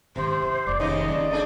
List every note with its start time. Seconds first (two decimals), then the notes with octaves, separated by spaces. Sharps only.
0.16 G#2 C3 D#3 C5
0.42 E4
0.67 F1 A#3 D5
0.80 D#2 C#3 C#4 D#4 D#5
1.08 E3 C4 D5
1.31 A3 D4 G#4